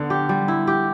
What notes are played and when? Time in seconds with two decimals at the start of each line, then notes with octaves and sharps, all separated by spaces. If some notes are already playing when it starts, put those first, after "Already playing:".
Already playing: D3 B3
0.10 G4
0.29 G3
0.48 E4
0.67 G4